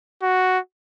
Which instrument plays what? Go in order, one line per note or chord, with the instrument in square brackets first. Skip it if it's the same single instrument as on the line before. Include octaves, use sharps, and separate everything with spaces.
[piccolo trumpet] F#4